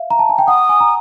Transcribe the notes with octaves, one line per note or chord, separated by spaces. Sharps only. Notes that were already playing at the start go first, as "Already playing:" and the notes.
Already playing: E5 F5
A#5
A5
G#5
G5
F#5 D#6
G#5
A#5